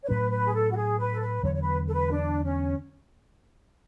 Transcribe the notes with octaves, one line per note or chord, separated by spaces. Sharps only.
C#5
A2 F#3 C#4 B4
B4
G#4
A4
F#4
G#4
B4
A4
B4
E2 D3 F#3 C#5
C#5
B4
A4
B4
D4
C#4